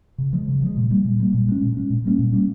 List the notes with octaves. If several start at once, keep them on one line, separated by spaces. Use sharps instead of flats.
C#3
F3 G#3
C#3
F3 G#3
A#2
G3 A#3
A#2
G3 A#3
A#2
G#3 C#4
A#2
G#3 C#4
A#2
G3 A#3 C#4
A#2
G3 A#3 C#4